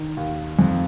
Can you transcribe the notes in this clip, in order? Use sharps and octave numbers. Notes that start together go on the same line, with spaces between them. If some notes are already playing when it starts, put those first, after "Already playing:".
Already playing: D#3
D#2
F2